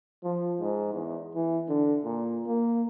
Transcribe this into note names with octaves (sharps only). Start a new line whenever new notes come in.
F3
G#2
E2
E3
D3
A#2
A#3